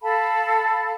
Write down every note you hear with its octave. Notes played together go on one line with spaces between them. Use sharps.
A4 F5 A5 B5